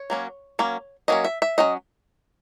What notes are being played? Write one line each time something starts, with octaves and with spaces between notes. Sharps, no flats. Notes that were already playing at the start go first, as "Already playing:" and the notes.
Already playing: C#5
F#3 A#3 C#4
F#3 A#3 C#4
F#3 A#3 C#4 D#5
E5
E5
F#3 C#4 D#5